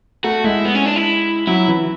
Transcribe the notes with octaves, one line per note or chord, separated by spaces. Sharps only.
A3 F#4
G#3 E4
B3
C#4
D4
E4
F#3 E4
E3